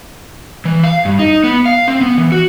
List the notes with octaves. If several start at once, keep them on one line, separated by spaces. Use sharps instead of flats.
E3
F5
G2
D#4
B3
F5
C4
B3
E3
F#4